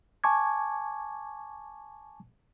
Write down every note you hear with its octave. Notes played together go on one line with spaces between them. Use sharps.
G#5 A5 C#6 D6 G#6